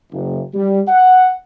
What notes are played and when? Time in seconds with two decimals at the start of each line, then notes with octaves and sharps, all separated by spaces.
0.13 F#1
0.54 G3
0.88 F#5